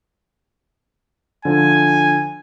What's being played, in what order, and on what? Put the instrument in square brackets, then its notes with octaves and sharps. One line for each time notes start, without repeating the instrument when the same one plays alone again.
[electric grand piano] D3 F3 [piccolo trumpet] G#5